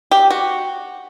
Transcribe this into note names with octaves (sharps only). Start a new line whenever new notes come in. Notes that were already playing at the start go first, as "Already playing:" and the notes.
G4
F#4